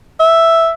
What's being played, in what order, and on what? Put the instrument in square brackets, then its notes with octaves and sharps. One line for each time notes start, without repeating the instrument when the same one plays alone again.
[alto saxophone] E5